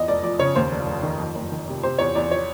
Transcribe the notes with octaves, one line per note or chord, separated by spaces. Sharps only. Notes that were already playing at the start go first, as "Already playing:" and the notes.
Already playing: E2 D#5
F1 D5
F3 D5
C#3 C#5
D#2 C5
F1
F1
D#3
F2
F#1
D#3
C3
C3 C5
E2 C#5
E2 D5
F3 C#5